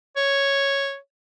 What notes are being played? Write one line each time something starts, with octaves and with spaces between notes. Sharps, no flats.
C#5